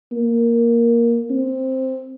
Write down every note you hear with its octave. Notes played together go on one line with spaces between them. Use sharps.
A#3
C4